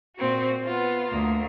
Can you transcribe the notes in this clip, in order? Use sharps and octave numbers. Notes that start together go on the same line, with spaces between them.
A#2 C4 F#4
B3 F4
D2 A#3